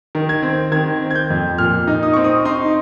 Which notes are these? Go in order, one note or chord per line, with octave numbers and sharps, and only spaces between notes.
D#3
G#6
C4
D#3 G#6
C4
G#6
G6
F2
A#2 F6
D#4
D#6
C4 C#6
D#6
D#4 C6